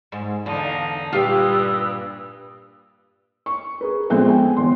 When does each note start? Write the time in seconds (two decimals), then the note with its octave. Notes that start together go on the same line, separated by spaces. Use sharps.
0.12 G#2
0.46 E2 D3 D#4 F5 A5
1.13 G2 A#2 G3 F4 G4 B4 D#6 E6
3.46 C#6
3.81 G#4 A#4 B4
4.10 A#1 G#3 B3 C4 G#4 A4
4.28 G5 G#5
4.56 G1 E2 C6